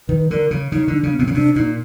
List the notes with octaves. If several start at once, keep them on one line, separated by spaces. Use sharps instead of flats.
D#3 B4
D3 A#4
C#3
C#3 D#4
D3
D4
C#3
B3
C3 C4
C#3 C#4
C3 D4
A#2 D#4